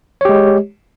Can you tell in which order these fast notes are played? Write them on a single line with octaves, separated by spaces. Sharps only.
C#5 G4 G#3